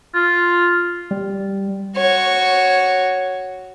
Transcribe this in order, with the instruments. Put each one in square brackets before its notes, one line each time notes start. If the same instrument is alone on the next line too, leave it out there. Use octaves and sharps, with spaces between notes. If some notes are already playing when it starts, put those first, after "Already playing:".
[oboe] F4
[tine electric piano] G3
[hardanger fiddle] F#4 C#5